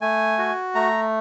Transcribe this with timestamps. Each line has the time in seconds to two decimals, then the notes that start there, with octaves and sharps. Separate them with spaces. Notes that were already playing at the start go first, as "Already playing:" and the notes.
0.01 A3 G#5
0.38 F#4
0.75 A3 A#5